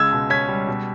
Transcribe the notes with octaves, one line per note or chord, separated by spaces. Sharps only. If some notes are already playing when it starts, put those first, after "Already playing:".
Already playing: C#2 G#3 E6 G#6
B2
C#4 G#6 B6
G3
B2